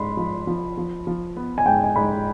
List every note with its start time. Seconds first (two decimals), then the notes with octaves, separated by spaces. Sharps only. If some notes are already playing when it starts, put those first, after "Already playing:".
Already playing: G#2 B5 C6
0.17 F3
0.47 F3
0.77 F3
1.07 F3
1.37 B3
1.58 G#5
1.66 G#2 G5
1.84 G#5
1.96 G#2 B5